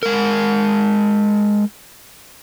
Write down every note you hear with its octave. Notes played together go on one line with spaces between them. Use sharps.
G#3 A#4